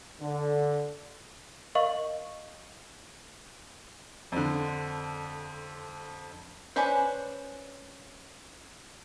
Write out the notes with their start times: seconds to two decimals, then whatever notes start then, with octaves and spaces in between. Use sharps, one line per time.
0.21 D3
1.75 A#4 D#5 F5 C#6 F#7
4.32 F2 D3
6.76 C#4 D4 B4 C5